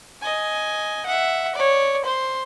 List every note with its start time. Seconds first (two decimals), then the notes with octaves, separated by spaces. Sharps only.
0.21 D#5 G#5
1.06 E5 F#5
1.55 C#5 D5
2.04 C5 C6